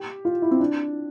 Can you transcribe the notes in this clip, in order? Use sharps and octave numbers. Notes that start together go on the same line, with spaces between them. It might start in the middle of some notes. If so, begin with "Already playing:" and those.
Already playing: G4
F4
E4
C4
D4